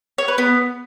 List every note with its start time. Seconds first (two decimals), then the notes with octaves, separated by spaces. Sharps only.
0.18 C#5
0.28 B4
0.38 B3